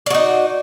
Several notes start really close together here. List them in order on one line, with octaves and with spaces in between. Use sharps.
D5 F#4 D#4